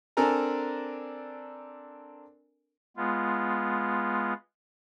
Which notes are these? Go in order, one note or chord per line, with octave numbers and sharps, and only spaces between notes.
C4 D4 A4 A#4 G#5 A#5
G#3 B3 F4